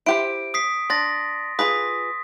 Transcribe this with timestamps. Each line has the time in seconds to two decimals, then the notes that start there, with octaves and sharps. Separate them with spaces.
0.06 E4 G4 C5 D7
0.54 D#6 B6 C7
0.90 D4 C6 A6 A#6
1.59 F4 G#4 B4 D#6 B6